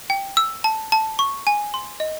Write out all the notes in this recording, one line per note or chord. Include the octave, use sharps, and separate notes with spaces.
G5
E6
A5
A5
C#6
G#5
C6
D#5